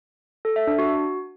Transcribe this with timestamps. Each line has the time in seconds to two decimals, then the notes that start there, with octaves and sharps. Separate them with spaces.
0.45 A4
0.56 E5
0.67 D4
0.79 F#4